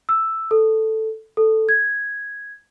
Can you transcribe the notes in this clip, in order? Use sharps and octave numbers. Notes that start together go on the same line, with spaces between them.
E6
A4
A4
G#6